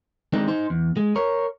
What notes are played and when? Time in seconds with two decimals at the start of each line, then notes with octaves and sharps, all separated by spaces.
0.33 D#3 G#3 C4 D4 D#4
0.48 D#4 C5
0.70 E2
0.97 G#3
1.16 A#4 C#5